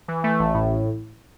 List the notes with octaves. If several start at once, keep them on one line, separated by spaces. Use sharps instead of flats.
E3
A3
A1
A2